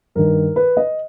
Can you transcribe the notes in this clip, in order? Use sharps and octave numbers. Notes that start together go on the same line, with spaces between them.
G2 D#3 A#4
B4
D#5